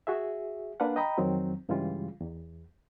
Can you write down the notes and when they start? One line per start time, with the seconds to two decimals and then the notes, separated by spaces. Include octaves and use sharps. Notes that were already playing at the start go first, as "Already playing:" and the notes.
0.07 F#4 G#4 E5
0.80 A#3 D4 B4 F5 F#5
0.96 D#5 G5 A#5 B5 D#6
1.18 F2 D#3 F#3 C4
1.69 G2 C#3 E3 G3 G#3 F4
2.21 E2